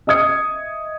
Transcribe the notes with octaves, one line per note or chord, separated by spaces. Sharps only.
D#5 E5 D#6 G#6 C#7